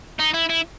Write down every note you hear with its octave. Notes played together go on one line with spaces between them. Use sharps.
D#4
E4
E4